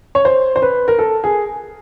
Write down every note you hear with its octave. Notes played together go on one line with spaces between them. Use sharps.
C#5
C5
C5
B4
A#4
A4
G#4